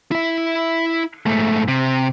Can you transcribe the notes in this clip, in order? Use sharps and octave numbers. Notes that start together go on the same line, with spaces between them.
E4 E5
G#2 A3
C3